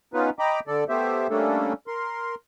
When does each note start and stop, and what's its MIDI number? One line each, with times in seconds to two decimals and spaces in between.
0.14 0.30 59
0.14 0.30 61
0.14 0.30 63
0.14 0.30 65
0.14 0.30 71
0.39 0.60 75
0.39 0.60 79
0.39 0.60 82
0.39 0.60 83
0.39 0.60 86
0.67 0.84 50
0.67 0.84 69
0.67 0.84 74
0.89 1.27 57
0.89 1.27 59
0.89 1.27 67
0.89 1.27 72
0.89 1.27 76
1.30 1.73 55
1.30 1.73 57
1.30 1.73 58
1.30 1.73 61
1.30 1.73 62
1.30 1.73 69
1.87 2.35 70
1.87 2.35 84